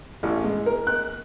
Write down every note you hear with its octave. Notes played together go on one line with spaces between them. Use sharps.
A1
G#3
A#4
F#6